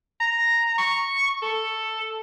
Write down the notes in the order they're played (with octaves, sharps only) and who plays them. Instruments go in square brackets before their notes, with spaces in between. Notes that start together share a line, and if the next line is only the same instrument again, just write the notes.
[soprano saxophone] A#5
C#6
A4